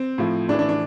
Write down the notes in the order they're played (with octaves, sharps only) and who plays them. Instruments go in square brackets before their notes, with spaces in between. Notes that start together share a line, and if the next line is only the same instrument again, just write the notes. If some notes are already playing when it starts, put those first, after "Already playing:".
Already playing: [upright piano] C4
A2 F3
A2 D4
E3
D4
D4